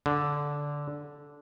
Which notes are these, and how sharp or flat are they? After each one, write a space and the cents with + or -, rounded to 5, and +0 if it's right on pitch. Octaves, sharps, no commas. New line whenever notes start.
D3 -10